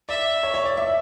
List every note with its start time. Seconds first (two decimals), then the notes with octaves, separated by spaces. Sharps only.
0.09 D5 E5
0.43 C#5
0.54 C#5
0.66 D5
0.77 E5